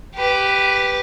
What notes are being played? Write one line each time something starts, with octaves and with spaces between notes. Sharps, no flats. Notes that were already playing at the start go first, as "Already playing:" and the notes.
G4 B4